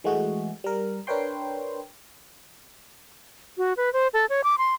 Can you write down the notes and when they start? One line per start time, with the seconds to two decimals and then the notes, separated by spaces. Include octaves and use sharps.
0.04 E3 G#3 A3 F#4 G#4
0.64 G3 A#4
1.07 D4 A#4 B4 C#5 G5 C6
3.58 F#4
3.77 B4
3.93 C5
4.13 A4
4.29 C#5
4.44 D6
4.58 C6